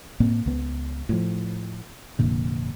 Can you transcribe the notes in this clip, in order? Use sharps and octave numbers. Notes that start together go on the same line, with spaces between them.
A2 A#3 C4
C#2 B3
A2 F3
F1 F2 A#2 D3